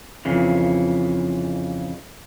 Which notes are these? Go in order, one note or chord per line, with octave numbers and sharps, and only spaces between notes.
F2 C#3 E3